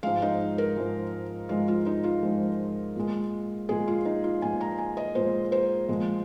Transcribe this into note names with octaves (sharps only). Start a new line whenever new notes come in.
G#2 F3 G#3 F5
D#4
A#4
G#2 F3 G#3
G#2 F3 G#3 F4
F4
D#4
F4
G#2 F3 G#3
A#2 G#3
A#2 G#3 G#4
F4
D#4
F4
A#2 G#3 G#5
A#5
G#5
D#5
A#2 G#3 C5
C5
A#2 F3 G#3